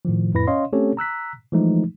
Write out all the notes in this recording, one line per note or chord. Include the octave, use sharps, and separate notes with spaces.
A2 D#3 F3
F2 A2 E4 B4 B5 A#6
C#4 C#5 D#5 F5 C6
A3 C4 C#4 G4 A4 C#5
A#5 E6 F#6 B6
E3 F3 G#3 A3 D#4